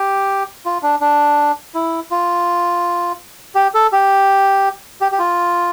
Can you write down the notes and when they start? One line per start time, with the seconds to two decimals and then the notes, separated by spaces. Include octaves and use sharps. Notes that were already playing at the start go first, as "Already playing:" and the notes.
Already playing: G4
0.65 F4
0.83 D4
1.01 D4
1.75 E4
2.11 F4
3.55 G4
3.74 A4
3.92 G4
5.01 G4
5.12 G4
5.19 F4